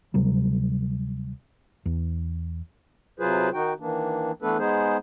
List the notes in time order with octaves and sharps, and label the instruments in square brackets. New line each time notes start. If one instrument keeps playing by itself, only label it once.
[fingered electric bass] D2 C3 F#3 G3
E2
[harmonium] C3 F#3 F4 G#4 B4 C5
D#3 D#4 F#4 G5
D#3 E3 A#3 D4
E3 A3 B3 D4 A4 B4
G#3 B3 D#4 G#4 C5